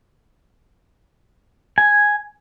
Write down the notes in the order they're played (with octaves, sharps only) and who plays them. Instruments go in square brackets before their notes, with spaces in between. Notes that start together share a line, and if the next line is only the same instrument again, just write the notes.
[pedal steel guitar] G#5